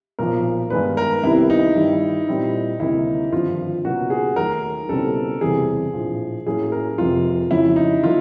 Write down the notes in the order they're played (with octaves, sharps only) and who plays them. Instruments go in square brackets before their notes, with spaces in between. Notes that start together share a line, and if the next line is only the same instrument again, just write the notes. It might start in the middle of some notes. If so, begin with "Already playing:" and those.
[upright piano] B1 A#2 F3 [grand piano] A#4
[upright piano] G2 D#3 G#3 B3 D4 [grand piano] B4
[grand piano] A#4
[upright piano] C2 C3 D#3 G3 B3 [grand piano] E4
[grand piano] D#4
[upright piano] G2 D#3 G3
A#2 G3 C4 E4
[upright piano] D2 C3 D#3 G3 A#3 [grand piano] E4
[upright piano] G#1 G2 D3 F3 [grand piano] F4
[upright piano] C#2 B2 F#3 A#3 D#4 [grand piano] F#4
[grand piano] G#4
[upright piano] D#2 D#3 F#3 A3 [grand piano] A#4
[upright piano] C#2 B2 G3 C4 E4 [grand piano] A4
[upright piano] F#1 E2 C3 E3 G3 [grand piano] G#4
[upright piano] A#1 A2 F3
[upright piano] A2 F#3 A#3 C#4 [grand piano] G#4
[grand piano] A#4
[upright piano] F1 F2 C3 [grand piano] F4
[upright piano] F2 C#3 F#3 [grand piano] E4
[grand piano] D#4
[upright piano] D3 F#3 A#3 [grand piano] F4